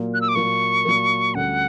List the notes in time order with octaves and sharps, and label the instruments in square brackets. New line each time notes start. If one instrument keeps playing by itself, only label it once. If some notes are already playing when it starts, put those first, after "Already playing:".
Already playing: [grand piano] A#2 F#3 A#3
[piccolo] F#6
E6
D6
[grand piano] A#2 F#3 A#3 [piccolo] C#6
[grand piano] A#2 F#3 A#3
[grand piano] D2 D3 G3 C#4 [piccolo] F#5